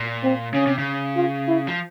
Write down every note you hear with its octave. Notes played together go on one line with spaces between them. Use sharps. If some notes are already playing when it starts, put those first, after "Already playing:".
Already playing: A#2
C4
C#3 C#4
C3
C#3
F4
E4
F3